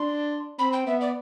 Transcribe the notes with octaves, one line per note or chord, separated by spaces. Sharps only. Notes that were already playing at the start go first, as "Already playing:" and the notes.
Already playing: D4 C6
C4 B5
G5
B3 E5
D5